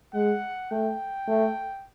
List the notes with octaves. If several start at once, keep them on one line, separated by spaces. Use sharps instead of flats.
G#3 F#5
A3 G5
A3